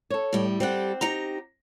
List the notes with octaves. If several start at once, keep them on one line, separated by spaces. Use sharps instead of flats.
A4 C#5
A2 G3
G3 C4 G4 A4 F#5
D#4 G4 A#5